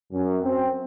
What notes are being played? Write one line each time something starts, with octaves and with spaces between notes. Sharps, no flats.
F#2
C4